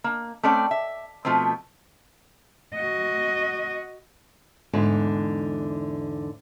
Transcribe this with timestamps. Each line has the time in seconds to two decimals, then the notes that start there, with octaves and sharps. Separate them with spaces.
0.04 A#3
0.43 A3 C4 C#4 D5 G5
0.71 E5
1.25 B2 F3 A3 B3 C4
2.75 F#4 D#5
4.73 E2 G#2 D3